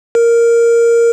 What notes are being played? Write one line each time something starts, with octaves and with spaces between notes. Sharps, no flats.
A#4